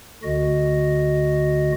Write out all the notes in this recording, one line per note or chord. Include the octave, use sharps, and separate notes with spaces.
D2 D3 F#4 D#5